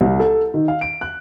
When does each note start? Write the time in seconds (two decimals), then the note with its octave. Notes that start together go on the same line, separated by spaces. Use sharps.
0.01 C2
0.20 A4
0.54 D#3
0.68 F5
0.81 D7
1.01 F#6